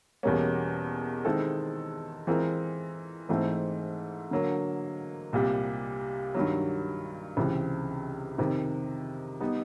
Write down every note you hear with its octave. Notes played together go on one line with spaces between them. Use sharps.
E2 B2 G3 A#3 C#4
D#3 G#3 C4 E4 A4
E3 G#3 C4 F4 A#4
G#2 E3 A3 C4
D3 F#3 A#3
C2 A#2 G3
G2 D#3 F#3
C#2 C3 E3
F2 C3 D#3
G3 B3 D#4